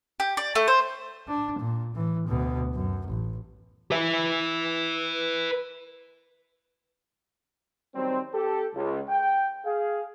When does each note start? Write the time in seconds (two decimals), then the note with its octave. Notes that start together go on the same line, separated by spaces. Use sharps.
0.20 G4
0.37 D5
0.55 A3
0.68 C5
1.28 D4
1.59 A#2
1.95 A2 E3
2.28 D2 B2
2.74 F#2
3.08 A1
3.92 B4 E5
7.95 D#3 F#3 G3 C4
8.34 G4 A4
8.74 C#2
9.08 G5
9.65 G#4 F5